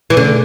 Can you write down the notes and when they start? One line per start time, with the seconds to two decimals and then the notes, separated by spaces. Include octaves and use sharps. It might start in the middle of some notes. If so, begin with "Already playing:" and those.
0.10 E3
0.16 B2 D3 A3 C#4 G#4